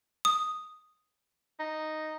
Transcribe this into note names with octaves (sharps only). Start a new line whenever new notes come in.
D#6
D#4